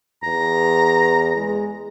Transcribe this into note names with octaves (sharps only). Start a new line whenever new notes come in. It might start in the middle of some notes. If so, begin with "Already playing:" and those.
E2 A#5
G#3